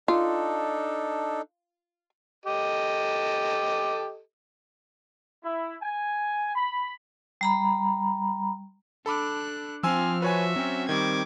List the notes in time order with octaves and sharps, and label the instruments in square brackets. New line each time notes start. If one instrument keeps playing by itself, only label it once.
[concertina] D4 D#4 A4 [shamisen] F4
[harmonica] G4 A4 D#5
[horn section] E4
G#5
B5
[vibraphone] G3 A#5 B5
[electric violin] D4 F#6 [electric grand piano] A4 B5 D6
[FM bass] F3 [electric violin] C4 F6 [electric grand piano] G#5 C6 E6
[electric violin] F#4 E5 [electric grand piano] B4 C#5 G#5
[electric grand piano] F#3 C#4 [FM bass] C4
[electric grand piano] D#3 G3 [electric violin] D6 G#6